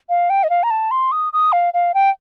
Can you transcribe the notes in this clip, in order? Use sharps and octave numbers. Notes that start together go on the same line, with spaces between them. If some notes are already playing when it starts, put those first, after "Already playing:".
F5
G5
D#5
F5
A#5
A5
C6
D#6
D#6
F5
F5
G5